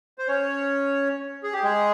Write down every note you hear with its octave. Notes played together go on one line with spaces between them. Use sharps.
C5
C#4 C#5
G#4
G4
G#3 G#4